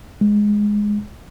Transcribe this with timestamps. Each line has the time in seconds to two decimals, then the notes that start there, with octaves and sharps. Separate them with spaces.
0.21 G#3